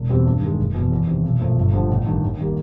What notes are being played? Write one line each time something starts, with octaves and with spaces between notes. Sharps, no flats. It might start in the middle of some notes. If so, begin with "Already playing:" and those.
Already playing: E1
E2 B2 G3 C4
G2
D#3 G#3
F#1
E2 B2
E2
C3 D#3
B1
A#2 F3 A3
G1
G2 D3 F3
A1
G2 D#3
D#2
D#3 G3 A#3